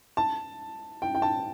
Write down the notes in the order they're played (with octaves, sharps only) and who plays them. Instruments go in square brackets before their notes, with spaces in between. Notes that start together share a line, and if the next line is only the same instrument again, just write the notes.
[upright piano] A5
G5
G5
A5